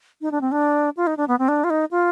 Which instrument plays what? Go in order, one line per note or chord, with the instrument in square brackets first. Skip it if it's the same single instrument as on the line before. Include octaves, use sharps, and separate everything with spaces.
[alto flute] D#4
D4
C4
D4
F4
D#4
D4
B3
C4
D4
F4
D#4
F4